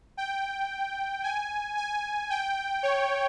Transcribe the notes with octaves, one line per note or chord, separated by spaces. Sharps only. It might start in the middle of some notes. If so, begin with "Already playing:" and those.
G5
G#5
G#5
G5
C#5